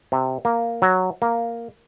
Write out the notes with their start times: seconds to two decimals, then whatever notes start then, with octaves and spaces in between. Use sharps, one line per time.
0.12 C3
0.45 A#3
0.82 F#3
1.22 A#3